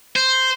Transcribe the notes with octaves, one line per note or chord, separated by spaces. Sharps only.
C5